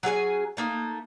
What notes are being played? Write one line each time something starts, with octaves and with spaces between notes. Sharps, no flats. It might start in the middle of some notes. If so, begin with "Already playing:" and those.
F#3 C#4 G#4 G#5
A3 A#3 D#4